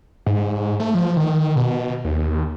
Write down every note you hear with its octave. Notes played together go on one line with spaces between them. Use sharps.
G#2
A3
F3
D#3
B2
D#2